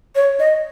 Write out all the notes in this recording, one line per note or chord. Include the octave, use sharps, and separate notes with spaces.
C#5
D#5